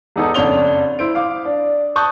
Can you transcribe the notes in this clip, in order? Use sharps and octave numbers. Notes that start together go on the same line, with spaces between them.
E2 B3 D#4 A4 D#6
F#1 F2 D4 C#5 F7 G7
E4 C5 D7
F5 D6
D4
A5 C#6 D#6 F#6 G6